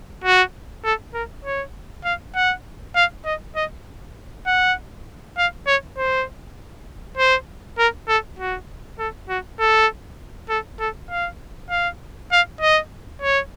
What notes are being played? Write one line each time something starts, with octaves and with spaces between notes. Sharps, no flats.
F#4
A4
A#4
C#5
F5
F#5
F5
D#5
D#5
F#5
F5
C#5
C5
C5
A#4
A4
F#4
A4
F#4
A4
A4
A4
F5
F5
F5
D#5
C#5